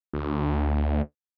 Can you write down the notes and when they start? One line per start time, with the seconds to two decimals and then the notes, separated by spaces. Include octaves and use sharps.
0.14 D2